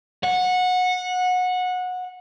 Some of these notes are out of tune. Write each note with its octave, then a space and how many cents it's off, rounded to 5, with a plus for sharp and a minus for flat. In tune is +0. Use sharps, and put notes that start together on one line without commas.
F#5 -20